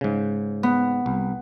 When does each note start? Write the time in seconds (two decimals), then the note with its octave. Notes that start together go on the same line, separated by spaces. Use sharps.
0.01 G#2 C#3
0.63 B3
1.06 C2